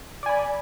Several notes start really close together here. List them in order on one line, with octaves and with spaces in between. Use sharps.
D5 G#5 B5